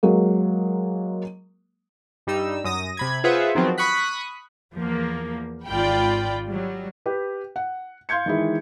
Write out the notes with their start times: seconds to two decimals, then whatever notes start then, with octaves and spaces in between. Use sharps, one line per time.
0.03 F#3 G#3 A#3
2.27 G2 G3 D#4 E6
2.64 F#2 D#6 A#6
2.97 C3 B5 G#6
3.24 F4 G#4 B4 C5 E5 F#5
3.55 D#3 F3 F#3 B3 C4
3.78 B5 C#6 D#6 F#6 B6
4.73 E2 F3 A#3
5.67 G#1 F4 D5 G5 B5
6.48 F#3 G3
7.06 G4 B4
7.56 F#5
8.09 F5 C6 G6 G#6 C#7
8.26 D#3 E3 G#3 E4